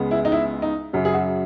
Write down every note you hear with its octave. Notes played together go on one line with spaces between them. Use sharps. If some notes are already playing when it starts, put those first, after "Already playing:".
Already playing: C#2 C#3 G#3 B3
E4
D#4
E4
D#4
F#2 C#3 F#3
G#4
F#4